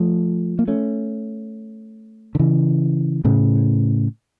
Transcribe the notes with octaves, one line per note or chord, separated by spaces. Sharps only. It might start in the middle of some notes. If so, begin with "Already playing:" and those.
Already playing: F3 A3
A#3
A3 C#4
D3
C#3 E3
A2 C#3